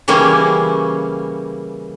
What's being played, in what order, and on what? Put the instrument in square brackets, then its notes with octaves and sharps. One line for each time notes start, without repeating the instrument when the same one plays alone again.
[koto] C#3 E3 G3 A#3 C#4